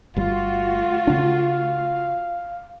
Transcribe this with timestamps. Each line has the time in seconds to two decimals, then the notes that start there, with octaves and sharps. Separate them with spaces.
0.16 G1 G3 A3 F4 F#4 F5
1.07 C#3 D4